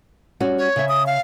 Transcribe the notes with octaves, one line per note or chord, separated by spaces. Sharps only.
G3 C#4 F#4
C#5
C#3 E5
D#6
F5